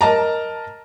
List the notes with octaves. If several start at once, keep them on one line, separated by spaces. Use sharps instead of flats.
A#4 D#5 A5 A#5